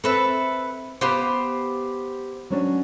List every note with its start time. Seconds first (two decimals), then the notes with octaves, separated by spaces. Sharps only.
0.04 C4 A4 B4 E5
1.01 B3 G4 C5 F5
2.50 F#3 C#4 D4